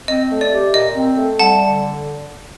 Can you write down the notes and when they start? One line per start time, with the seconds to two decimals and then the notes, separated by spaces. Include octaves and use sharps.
0.08 C4 D#5
0.30 A3
0.41 D5
0.52 G4
0.74 A#2 D#5
0.95 C4
1.18 A3
1.39 G3 F#5 A5
1.61 D3